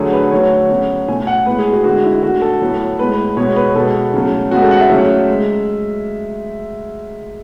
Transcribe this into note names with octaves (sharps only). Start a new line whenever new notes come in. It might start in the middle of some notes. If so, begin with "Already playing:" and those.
Already playing: D3 F#3 A3 G#4
B4
D3 F#3 A3 C#5
C#3 F#3 B3
B2 A3 G#5
F#5
A2 G#3 B3 B4
G#4
F#4
D3 G#3 B3 F#4
E4
D3 A3 F#4
A4
A2 F#3 B3
A2 G#3 B3 B4
B2 G#3 B3 C#5
B4
B2 G#3 B3 A4
C#3 F#3 A3
C#3 G#3 B3 F#4
A4
F#5
E5
C#3 F#3 A3
G#3